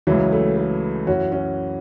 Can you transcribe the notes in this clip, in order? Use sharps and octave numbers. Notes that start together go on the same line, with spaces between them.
C#2 C#3 E3 F#3
A3
A3
F#2 E3 C#4 F#4
C#4 F#4